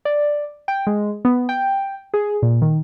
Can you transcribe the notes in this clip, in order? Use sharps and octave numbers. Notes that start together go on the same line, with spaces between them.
D5
G5
G#3
B3
G5
G#4
A#2
D#3